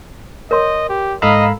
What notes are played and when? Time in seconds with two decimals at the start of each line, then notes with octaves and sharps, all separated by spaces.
0.51 A#4 C#5 D#5 C6
0.89 G4
1.22 G#2 A4 D#5 F5 A#5 B5 E6